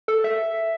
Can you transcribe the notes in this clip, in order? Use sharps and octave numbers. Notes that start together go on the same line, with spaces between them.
A4
E5